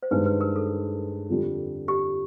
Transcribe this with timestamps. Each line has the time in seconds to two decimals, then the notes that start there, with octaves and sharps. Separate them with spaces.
0.03 C5
0.11 G2 D#3 G#3 B4
0.26 B4
0.41 A#4
0.56 A4
1.29 F2 D3 G3
1.88 G4